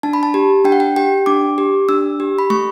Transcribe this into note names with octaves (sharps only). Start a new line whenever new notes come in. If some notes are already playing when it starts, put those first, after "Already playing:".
D4 A5
B5
A5
G4
D4 G5
F#5
G5
G4 G5
D4 D6
G4
D4 E6
G4
B5
A3 C#6